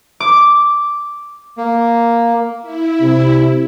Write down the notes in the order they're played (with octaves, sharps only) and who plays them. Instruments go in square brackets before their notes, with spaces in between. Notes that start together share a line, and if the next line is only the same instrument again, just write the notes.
[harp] D6
[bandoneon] A#3
[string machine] E4
[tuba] C3